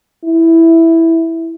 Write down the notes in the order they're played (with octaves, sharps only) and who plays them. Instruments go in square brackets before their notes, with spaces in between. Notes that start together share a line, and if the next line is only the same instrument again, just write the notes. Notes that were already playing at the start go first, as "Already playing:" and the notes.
[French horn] E4